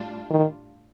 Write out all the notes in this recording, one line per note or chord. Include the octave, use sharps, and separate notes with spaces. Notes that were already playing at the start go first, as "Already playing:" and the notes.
Already playing: A2 G3 D4 F4
D#3